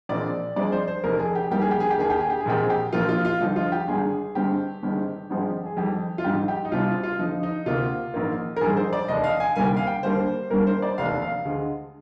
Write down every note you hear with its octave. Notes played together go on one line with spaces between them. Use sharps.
A#1 A#2 G#3 C4 D5
G2 F3 G#3 C4 D5
C5
C5
F1 F2 D#3 A#4
G#4
G4
F2 D#3 G3 A#3 G4
G#4
G4
G#4
G4
D#2 D#3 A#3 G#4
G4
G#4
G4
G#4
A#1 A#2 G#3 C4 G4
G#4
G4
A#1 A#2 F3 A#3 F4
F4
F4
G1 F2 D3 F3 D#4
F4
G4
G#1 G2 D3 G#4
G2 D3 G#3 C4 G4
G1 G2 D#3 G#3 C4
G#1 G2 F3 G#3 C4
G#4
F2 D#3 G3 G4
F4
A#1 G#2 D#3 G3 G4
G4
D#4
C2 C3 G3 F4
F4
F4
F2 D3 F3 D#4
D#4
D2 C3 D#3 A#3 F4
A#1 G#2 D#3 A#3
A#4
A#1 G#2 G3 G#4
C5
D5
F1 D#2 D#3 D#5
F5
G#5
D2 C3 D#3 G3 A#3 G#5
G5
F5
G5
D#2 D3 G3 A#3 C5
G2 D#3 G3 A#3 A#4
C5
D5
F1 D#2 D#3 A#3 F5
F5
D2 D3 G#3